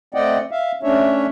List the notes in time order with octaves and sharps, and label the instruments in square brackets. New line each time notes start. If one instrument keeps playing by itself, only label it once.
[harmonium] A3 C4 D5 D#5 F#5 G5
E5 F5
A3 C#4 D4 C#5 E5